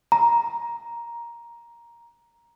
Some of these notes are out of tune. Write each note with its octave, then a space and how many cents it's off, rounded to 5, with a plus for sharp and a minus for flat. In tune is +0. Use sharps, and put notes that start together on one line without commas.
A#5 +10